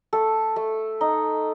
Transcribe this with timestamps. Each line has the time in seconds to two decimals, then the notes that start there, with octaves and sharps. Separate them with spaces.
0.13 A3 A4
0.56 A3
1.01 D#4